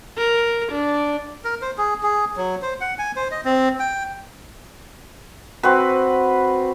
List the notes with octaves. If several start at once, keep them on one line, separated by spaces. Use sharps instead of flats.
A#4
D4
A#4
C5
G#4
G#4
F#3
C5
F#5
G#5
C5
D#5
C4
G5
C4 F#4 B4